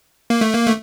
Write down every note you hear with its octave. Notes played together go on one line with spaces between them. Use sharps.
A#3
A3
A#3
A3